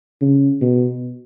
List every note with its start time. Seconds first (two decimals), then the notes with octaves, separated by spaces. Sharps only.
0.21 C#3
0.61 B2